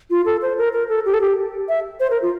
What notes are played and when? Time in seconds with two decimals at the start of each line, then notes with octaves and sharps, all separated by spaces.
0.10 F4
0.26 A4
0.42 C5
0.58 A#4
0.73 A#4
0.89 A4
1.05 G4
1.14 A4
1.21 G4
1.69 E5
2.00 C5
2.10 A#4
2.22 F4